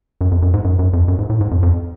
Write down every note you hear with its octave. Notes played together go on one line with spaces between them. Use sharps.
F#2
F2
F#2
G#2
F#2
F#2
F2
F#2
G#2
A2
G#2
F2
F2